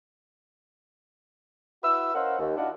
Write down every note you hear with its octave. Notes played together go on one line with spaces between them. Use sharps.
E4 F#4 B4 E6
C#4 A#4 C5 D#5 F5 F#5
D#2
D4 E4 F#4 D#5 F5 F#5